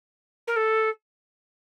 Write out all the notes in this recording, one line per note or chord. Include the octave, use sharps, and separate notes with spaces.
A#4
A4